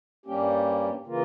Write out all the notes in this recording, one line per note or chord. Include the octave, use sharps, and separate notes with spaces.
G2 G3 A#3 C#4 G4
C#3 E3 A#3 F4 A#4